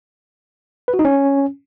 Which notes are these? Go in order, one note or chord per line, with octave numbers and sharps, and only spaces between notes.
B4
F#4
D#4
C#4